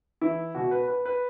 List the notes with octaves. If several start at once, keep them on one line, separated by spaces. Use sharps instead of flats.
E3 E4
B2 F#4
B4
B4
B4